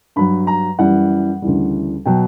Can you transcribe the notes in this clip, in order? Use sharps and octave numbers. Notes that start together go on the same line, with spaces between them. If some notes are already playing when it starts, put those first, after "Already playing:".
G2 F#3 B5
A#5
F#2 E3 G3 F#5
D2 C#3 E3 G3
B2 F#3 G5